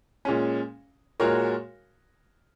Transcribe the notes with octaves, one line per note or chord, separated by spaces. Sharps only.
A#2 G#3 C#4
A#2 G#3 F#4 A#4 C#5